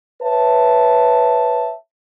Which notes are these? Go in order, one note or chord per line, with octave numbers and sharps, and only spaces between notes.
B4 C#5 E5 A5